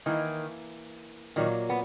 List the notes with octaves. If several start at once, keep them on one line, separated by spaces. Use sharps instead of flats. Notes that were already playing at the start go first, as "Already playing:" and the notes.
D#3 E3 A#3 E4
A#2 D#3 F#3 A#3
B3